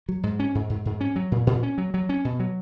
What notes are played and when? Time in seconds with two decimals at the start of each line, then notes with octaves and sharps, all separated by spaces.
0.09 F#3
0.23 G#2
0.40 C#4
0.55 G#2
0.70 G#2
0.85 G#2
1.01 C#4
1.16 F#3
1.32 A#2
1.47 A#2
1.63 C#4
1.78 F#3
1.94 F#3
2.09 C#4
2.25 B2
2.40 F#3